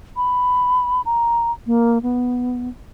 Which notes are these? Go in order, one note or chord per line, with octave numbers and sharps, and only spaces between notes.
B5
A#5
A#3
B3